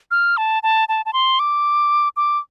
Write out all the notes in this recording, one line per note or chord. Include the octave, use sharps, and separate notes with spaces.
F6
A5
A5
A5
A5
C6
D6
D6